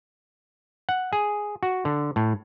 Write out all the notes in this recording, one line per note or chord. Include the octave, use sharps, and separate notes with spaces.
F#5
G#4
F#4
D3
A2